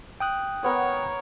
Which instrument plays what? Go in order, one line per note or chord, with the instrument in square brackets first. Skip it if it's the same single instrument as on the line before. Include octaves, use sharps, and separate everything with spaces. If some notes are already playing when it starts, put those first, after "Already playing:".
[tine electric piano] G5 D#6 F#6
[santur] B3 A#4 [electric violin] C#5